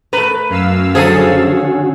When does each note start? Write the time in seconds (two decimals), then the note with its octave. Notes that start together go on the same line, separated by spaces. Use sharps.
0.13 A3 A#4 B4
0.50 F#2 F5 E6
0.95 D3 F3 F#3 C#4 F#4 G#4 A4 E5